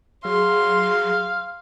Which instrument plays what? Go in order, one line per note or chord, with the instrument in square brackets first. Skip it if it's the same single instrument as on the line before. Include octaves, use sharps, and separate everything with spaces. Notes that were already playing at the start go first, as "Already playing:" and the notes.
[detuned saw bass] F#3 [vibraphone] G#4 [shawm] F5 [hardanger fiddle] C6